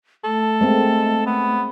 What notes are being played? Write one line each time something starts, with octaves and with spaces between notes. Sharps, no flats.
A3 A4
G#3 A#3 C4
B3